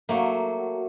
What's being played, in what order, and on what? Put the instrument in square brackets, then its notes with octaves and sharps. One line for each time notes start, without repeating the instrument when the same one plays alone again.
[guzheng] F#3 A3 A#3